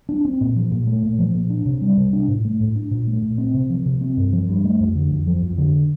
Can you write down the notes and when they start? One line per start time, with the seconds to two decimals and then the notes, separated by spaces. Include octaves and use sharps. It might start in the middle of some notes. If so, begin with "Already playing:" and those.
0.09 D4
0.25 C4
0.41 A#2
0.56 F3
0.72 A#2
0.87 A3
1.03 A#2
1.19 F3
1.34 A#2
1.50 D4
1.66 C3
1.81 G3
1.97 C3
2.13 D4
2.28 A2
2.45 A3
2.60 A2
2.76 D4
2.91 A#2
3.07 A3
3.22 A#2
3.38 C4
3.54 C3
3.70 F3
3.86 C3
4.01 C4
4.17 G2
4.33 F3
4.49 G2
4.64 A3
4.80 F2
4.95 D3
5.11 F2
5.27 F3
5.42 F2
5.58 D3